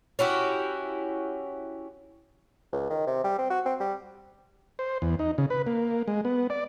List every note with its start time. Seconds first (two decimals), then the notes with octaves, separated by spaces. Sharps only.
0.19 C#4 E4 F#4 G4
2.73 C#2
2.90 D#3
3.07 C3
3.24 G3
3.38 C4
3.50 F#4
3.66 C4
3.80 G3
4.79 C5
5.02 E2
5.19 D#4
5.38 C#3
5.50 B4
5.67 A#3
6.08 G#3
6.25 B3
6.50 D5